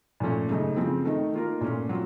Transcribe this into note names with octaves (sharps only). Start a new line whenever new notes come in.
A#2 F3 A3 C#4
F#2 C#3 A3 D#4
C#3 F3 C4
D#3 A3 D#4
D#3 A#3 F4 A#4
A#2 A3 C#4 F4
F#3 C4 F4